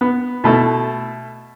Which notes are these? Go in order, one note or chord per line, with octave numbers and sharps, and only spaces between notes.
B3
B2 A3 E4